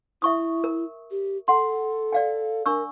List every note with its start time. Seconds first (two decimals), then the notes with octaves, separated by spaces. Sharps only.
0.22 E4 E5 C#6 D#6
0.64 A#4
1.11 G4
1.48 A4 F#5 C6
2.12 D5 F5 G5
2.66 D4 A#4 C#6 E6